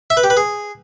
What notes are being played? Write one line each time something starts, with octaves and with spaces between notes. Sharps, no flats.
E5
B4
G4
B4
G#4